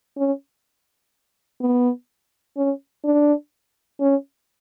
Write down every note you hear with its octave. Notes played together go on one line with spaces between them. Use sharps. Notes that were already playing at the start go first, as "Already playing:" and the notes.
C#4
B3
C#4
D4
C#4